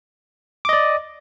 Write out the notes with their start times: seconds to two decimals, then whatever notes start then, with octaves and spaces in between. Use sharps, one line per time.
0.65 D6
0.69 D#5
0.73 D5